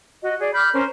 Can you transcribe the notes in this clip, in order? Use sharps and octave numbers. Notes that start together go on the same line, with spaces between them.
F#4 D#5
G#4 D5
B5 D6 F6 G6
C#4 A#4 C5